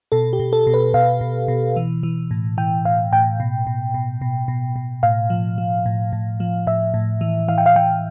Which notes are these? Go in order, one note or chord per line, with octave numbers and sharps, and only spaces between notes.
B2 A4
G4
B2
A4
B2
B4
B2 F5
B2
B2
E3
E3
A2
E3 G5
A2 F5
A2 G5
B2
B2
B2
B2
B2
B2
A2 F5
F3
F3
A2
A2
F3
A2 E5
A2
E3
E3 F5
G5
F5
E3 G5